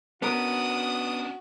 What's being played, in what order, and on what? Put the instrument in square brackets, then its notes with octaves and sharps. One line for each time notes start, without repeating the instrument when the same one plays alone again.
[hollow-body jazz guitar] B3 A#4 [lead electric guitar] C#4 D4 [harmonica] F#4 [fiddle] D#6